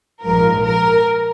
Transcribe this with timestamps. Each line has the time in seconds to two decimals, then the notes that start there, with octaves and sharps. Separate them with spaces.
0.23 A#1 G#2 F3 A#4
0.65 A#4